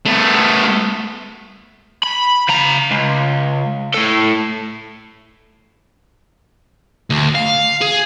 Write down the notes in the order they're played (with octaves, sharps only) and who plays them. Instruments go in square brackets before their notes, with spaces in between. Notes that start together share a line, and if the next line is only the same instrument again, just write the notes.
[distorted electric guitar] A3 B3
[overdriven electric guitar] B5
C#3 A#5
C#2
A2 A4
[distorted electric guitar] D2
F5
G#4